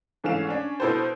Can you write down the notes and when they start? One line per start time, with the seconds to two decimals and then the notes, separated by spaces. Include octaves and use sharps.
0.24 G#2 E3 A3 C#4 F5 E7
0.49 C#4 D4
0.80 B2 E4 A4 B4 C5